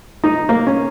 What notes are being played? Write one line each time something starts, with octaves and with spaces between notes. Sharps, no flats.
D#4
A#3
C#4